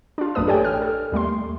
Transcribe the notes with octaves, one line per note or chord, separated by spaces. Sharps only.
D4 F4
A1 F#2 A3 D4 B4 D#6
G4 A4 C#5 D5 G5 G#5
F6
A4
D#2 G3 A3 C6